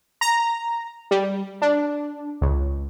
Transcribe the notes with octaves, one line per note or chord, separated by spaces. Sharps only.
A#5
G3
D4
C#2